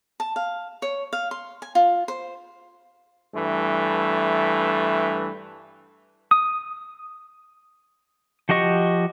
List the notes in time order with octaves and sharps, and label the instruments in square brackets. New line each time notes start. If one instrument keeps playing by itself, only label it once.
[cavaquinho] A5
F5
C#5
F5
C6
G#5
F4
C5
[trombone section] G2 E3 A3
[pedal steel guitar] D#6
F3 F#4 G4 D#5 C#6